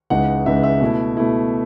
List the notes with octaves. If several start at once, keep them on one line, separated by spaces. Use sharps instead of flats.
C#2 C#3 E3 G#3 D#4 F#5
C#2 C#3 E3 G#3 D#4 E5
E5
B2 A3 E4
B2 A3 E4